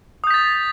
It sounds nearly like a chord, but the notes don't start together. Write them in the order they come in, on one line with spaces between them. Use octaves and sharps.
D#6 G6 B6 A6